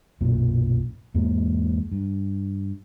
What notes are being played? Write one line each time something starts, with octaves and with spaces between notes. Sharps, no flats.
B1 F#2 A#2
E2 G#2 E3 A#3
G2